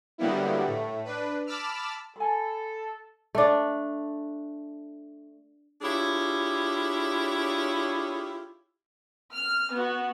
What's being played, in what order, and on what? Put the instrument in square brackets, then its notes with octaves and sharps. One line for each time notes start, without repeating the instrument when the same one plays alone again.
[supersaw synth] D3 F#3 G3 A#3 B3 E4
A2 A3
D4 B4
A5 B5 D6 E6 F6
[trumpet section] A4 [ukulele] G#5 B5
[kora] A3 D4
[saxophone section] D4 E4 F4 G4 G#4 C#5
[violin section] F6
B3 F#4